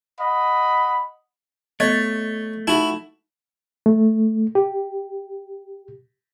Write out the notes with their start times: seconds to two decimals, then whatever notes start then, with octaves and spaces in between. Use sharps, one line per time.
0.19 D#5 F#5 B5
1.80 A3 B3 C#5 D#5
2.67 D#4 E4 F#4
3.86 A3
4.55 G4